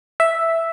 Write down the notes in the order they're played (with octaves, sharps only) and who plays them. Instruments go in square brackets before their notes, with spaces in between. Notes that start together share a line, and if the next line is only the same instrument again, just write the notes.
[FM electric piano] E5